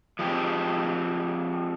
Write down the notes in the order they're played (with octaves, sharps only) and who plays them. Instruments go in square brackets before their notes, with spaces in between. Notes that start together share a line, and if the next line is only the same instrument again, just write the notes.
[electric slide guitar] F3 G#3 C4 G4